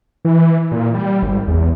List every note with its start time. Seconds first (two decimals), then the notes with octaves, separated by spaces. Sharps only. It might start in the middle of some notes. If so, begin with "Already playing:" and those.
0.25 E3
0.72 A#2
0.94 G3
1.23 G#1
1.48 E2